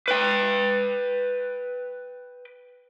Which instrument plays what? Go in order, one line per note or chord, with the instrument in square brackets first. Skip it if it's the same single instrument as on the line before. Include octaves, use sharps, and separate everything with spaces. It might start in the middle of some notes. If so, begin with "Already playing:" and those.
[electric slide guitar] B4 G5